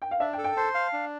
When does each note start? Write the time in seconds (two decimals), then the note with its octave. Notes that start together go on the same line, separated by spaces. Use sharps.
0.02 G5
0.11 F5
0.20 D4 E5
0.33 G5
0.38 A4
0.44 G5
0.57 C5 A5
0.75 F5
0.93 D4